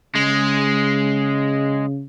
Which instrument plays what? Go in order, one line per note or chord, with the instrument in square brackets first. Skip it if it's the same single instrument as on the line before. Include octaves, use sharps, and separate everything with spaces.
[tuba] C#3 [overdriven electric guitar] G#3